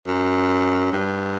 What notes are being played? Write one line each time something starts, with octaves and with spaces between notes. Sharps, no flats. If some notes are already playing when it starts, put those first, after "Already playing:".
F#2
G2